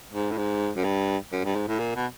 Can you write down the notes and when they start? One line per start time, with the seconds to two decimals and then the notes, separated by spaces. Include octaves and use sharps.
0.14 G#2
0.31 A2
0.37 G#2
0.76 F#2
0.84 G2
1.32 F#2
1.44 G2
1.55 G#2
1.68 A2
1.79 A#2
1.95 B2